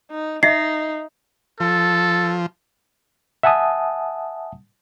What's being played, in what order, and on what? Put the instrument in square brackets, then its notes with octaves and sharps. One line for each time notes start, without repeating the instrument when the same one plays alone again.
[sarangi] D#4
[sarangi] D#4 [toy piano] D#5 E5 [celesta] C7
[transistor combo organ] F3 [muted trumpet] A4
[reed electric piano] E5 F#5 G#5 A5 D#6